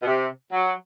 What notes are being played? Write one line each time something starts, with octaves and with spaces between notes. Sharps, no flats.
B2
C3
F#3